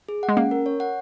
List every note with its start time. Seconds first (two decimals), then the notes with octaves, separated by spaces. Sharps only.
0.09 G#4
0.23 F#5
0.29 G#3
0.37 A#3 C#4
0.51 A#4
0.66 C#5
0.80 F#5